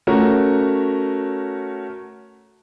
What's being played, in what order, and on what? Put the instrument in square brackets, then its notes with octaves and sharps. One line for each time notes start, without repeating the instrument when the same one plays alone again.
[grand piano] A3 C#4 F#4 A#4